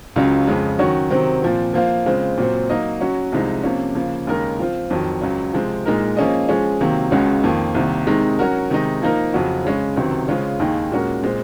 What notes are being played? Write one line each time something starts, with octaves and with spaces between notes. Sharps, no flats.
C#2 C#3 F#3 C#4 F4
F2 C#3 G#3
D#3 F#3 C#4 F#4 C#5
C3 D#3 F#3 C4
A#2 F3 C4
F3 A#3 F4 C5 F5
C#3 G#3 C4 F4
A#2 F#3 C4
F#3 A#3 D#4 A#4 D#5
F#3 C#4 F#4
C2 C3 F3 G#3 D#4
C3 F3 A#3 C#4
C#3 F3 A#3
D#2 C#3 G#3 D#4 A#4
F3 C4 F4
F2 D#3 F#3
C#2 C#3 F#3
C3 F3 G#3 C4
A#2 G#3 D#4 A#4
F3 A#3 C#4 G#4 D#5
F3 G#3 C#4 G#4
C3 D#3 F#3 A#3
C#2 C#3 G#3 C#4 F#4
F2 D#3 A#3
C2 C3 D#3 A#3
C3 D#3 G#3 D#4
F#3 C#4 F#4 A#4
C3 D#3 G#3 D#4
F3 A#3 D#4 A#4
F2 C#3 F#3 C#4 F#4
C#3 G#3 C#4
C#2 C3 D#3 F#3
C#3 G#3 C#4 F4 C5
D#2 D#3 A#3 D#4 G#4
A#2 G#3 C#4 F#4 A#4
A#2 G#3 C4